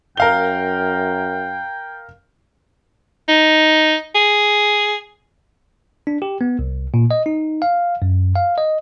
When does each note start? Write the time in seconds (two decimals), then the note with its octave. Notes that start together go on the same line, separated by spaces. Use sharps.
0.17 F#2 A#4 F5 G5 G7
3.29 D#4
4.15 G#4
6.07 D4
6.22 G4
6.41 B3
6.59 C2
6.94 A#2
7.11 D#5
7.26 D#4
7.62 F5
8.02 F#2
8.36 F5
8.58 D#5